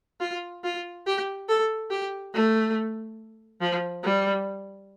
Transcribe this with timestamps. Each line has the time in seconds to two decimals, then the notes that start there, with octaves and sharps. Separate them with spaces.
0.20 F4
0.64 F4
1.07 G4
1.49 A4
1.91 G4
2.34 A3
3.61 F3
4.04 G3